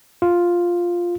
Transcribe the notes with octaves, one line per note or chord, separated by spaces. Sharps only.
F4